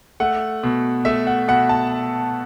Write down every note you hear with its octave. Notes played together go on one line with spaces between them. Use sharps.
A3 F#5
B2
A3 E5
F#5
B2 F#5
A5